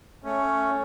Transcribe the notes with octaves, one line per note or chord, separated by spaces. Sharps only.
A3 C#4